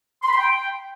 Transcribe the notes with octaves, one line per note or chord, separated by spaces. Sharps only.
C6
B5
C6
G5